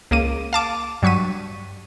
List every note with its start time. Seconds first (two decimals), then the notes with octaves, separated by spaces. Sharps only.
0.11 C#2 A#3 D6 D#7
0.53 F5 A5 D6
1.02 G2 F#3 C#6 B6 D#7